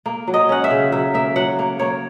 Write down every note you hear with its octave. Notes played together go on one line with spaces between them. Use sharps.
A#3
F#3
D#5
C#4 F#5
E5
C#3
F#3 E5
A#3 E5
F#3 F#5
A#3
A#3 C#5